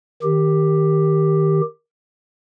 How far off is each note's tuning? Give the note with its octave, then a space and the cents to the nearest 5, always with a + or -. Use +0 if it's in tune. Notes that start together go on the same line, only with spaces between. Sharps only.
D#3 +0 G4 +5